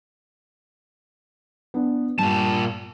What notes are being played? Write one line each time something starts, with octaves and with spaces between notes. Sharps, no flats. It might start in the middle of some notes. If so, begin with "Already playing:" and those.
B3 D4
G2 A#2 A5